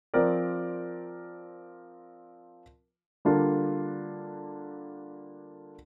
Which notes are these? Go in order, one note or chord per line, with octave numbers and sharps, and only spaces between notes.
F3 C4 A#4 D5
D3 G3 A#3 D4 F4